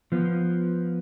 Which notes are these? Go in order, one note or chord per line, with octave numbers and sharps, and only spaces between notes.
F3 B3